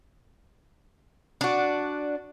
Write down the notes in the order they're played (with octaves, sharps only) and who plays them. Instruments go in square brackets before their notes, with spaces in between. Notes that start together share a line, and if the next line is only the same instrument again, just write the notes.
[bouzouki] D4 F#4